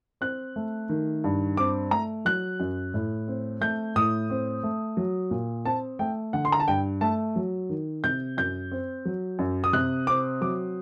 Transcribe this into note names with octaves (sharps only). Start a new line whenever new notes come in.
C4 F#6
A3
D#3
G2
C4 D6
A3 A#5
F#3 F#6
F#2
A2
C4
A3 G6
A2 D#6
C4
A3
F#3
A#2
C4 A5
A3 G5
D3 F#5
C6
A#5
A5
G2 G5
A3 A5
F#3
D#3
C3 G6
F#2 G6
C4
F#3
F#2
D#6
C3 F#6
C4 D6
F#3 D6